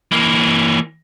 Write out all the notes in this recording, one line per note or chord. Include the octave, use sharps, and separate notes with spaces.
E3 A#3